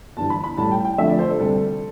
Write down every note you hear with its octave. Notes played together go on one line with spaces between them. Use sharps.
G1 G2 E3 A5
B5
B5
A1 A2 G3 A5
G5
G5
F2 D3 F3 A3 D4 E5
D5
C5
A4
D2 C3 G3 D4 A4